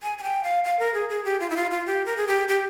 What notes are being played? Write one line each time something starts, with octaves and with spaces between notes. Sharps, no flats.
G#5
G#5
G5
F5
F5
A#4
G#4
G#4
G4
F4
E4
F4
F4
G4
A#4
G#4
G4
G4